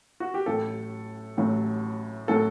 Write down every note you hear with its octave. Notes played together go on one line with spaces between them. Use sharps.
F#4
G4
A1 A2 F#3 A4
A1 A2 F#3
A2 F#3 A4